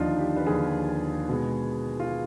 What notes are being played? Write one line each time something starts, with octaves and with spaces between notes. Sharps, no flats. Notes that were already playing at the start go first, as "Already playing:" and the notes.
Already playing: D#2 D3 F3 D4 D#4 F4
G4
B4
D#2 D3 F3 G#4
B2 G#3 B3
F4